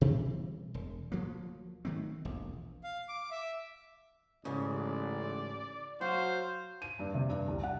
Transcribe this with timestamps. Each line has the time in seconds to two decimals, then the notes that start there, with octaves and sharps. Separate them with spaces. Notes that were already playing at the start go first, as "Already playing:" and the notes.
0.01 B2 E3 G3 C4
0.74 E1
1.12 D2 F3 F#3 A#3
1.85 D#3 F#3 A3 C4
2.25 E1 A#1
2.84 F5
3.09 D6
3.31 E5
4.45 A1 G#2 C#3 D5
6.01 F#3 F#4 C5 F5
6.82 D#7
6.99 G2
7.14 C3
7.29 G2
7.48 C2
7.63 F#5